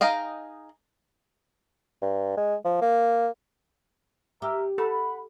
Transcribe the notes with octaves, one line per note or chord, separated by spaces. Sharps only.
D#4 G#4 D#5 F5 G5
G2
G#3
F3
A#3
G4 A#4 E5
A4 F#5 B5